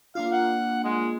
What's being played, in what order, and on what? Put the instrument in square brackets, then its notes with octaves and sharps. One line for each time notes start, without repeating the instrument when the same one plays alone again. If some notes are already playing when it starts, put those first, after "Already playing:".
[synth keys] A#3 D4 F4 [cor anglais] F5
[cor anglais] F#5
G#3